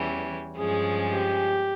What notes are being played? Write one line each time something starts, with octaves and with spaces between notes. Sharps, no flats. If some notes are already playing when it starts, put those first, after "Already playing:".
Already playing: E2 E3 G3 C#4
G2 F3 G#3 C#4 G#4
G4